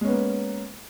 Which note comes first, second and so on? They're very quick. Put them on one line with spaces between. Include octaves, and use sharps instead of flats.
G#3 C#4 B3 A#3